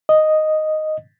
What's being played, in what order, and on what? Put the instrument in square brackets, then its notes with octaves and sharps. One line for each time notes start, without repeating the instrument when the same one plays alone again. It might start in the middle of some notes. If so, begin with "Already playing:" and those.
[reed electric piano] D#5